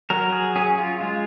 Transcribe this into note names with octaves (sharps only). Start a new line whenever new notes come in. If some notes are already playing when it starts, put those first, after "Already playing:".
F#3 A#4
G#4
C#4 G#4
F4
G#3 F4